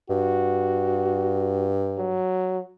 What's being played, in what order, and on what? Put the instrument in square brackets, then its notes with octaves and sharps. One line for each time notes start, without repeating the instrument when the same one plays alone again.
[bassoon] G2 [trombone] F#4
[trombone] F#3